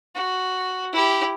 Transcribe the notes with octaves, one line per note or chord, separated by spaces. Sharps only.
F#4
E4 G4